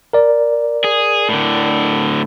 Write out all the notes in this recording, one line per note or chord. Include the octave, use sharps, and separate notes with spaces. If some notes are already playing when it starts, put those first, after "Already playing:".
A#4 D5
G#4
A2 D3